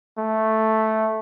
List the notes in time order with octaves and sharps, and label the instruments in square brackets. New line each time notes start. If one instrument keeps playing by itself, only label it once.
[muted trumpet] A3